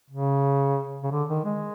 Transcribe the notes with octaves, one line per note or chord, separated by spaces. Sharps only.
C#3
C#3
D3
D#3
G#3